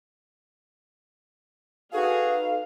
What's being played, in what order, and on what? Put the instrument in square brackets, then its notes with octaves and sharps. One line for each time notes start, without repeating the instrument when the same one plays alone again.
[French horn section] D#4 B4 [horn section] F#4 G#4 [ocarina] A4 [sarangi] F5